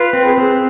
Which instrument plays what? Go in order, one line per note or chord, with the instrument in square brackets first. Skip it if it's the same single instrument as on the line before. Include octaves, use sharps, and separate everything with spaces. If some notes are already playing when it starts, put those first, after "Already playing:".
Already playing: [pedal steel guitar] F4 [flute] B4
[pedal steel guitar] C4
[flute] G#4
B4
[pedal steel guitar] C4 [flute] G#4